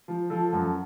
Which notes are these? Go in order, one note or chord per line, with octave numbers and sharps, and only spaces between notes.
F3
F3 A4
F#2